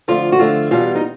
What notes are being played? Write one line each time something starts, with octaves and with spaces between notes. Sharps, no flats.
D3 F3 A3 F4
F#4
D3 F3 A3 F4
E2 B2 G3 F4
D#4